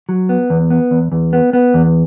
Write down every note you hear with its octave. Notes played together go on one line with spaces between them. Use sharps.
F#3
B3
E2
B3
E2
E2
B3
B3
E2